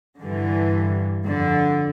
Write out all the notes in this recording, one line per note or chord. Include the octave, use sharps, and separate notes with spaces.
G2 D3 E3
F2 D3